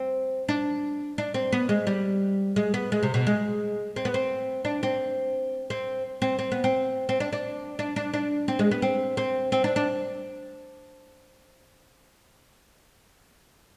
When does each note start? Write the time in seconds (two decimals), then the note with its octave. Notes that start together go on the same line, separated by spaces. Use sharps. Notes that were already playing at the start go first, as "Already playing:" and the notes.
Already playing: C4
0.48 D4
1.18 D4
1.34 C4
1.52 B3
1.69 G#3
1.87 G3
2.56 G#3
2.74 B3
2.92 G#3
3.03 C3
3.14 B2
3.27 G#3
3.96 C4
4.05 B3
4.14 C4
4.65 D4
4.83 C4
5.70 C4
6.22 C4
6.39 C4
6.52 B3
6.64 C4
7.09 C4
7.20 D4
7.33 D4
7.79 D4
7.96 D4
8.14 D4
8.48 C4
8.59 G#3
8.71 B3
8.82 C4
9.17 C4
9.52 C4
9.64 D4
9.76 D4